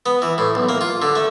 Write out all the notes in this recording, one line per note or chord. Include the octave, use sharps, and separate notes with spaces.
B3
E3
A2
B1
A#3
F4
D3
A3